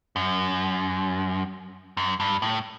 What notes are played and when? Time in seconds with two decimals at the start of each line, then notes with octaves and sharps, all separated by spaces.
0.16 F#2
1.97 F#2
2.20 G2
2.42 A2